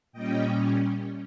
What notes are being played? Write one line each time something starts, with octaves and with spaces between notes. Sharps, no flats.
A#2 G3 C#4 D#5 G5